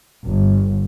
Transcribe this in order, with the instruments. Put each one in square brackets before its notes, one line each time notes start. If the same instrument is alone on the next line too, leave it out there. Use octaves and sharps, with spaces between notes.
[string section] G1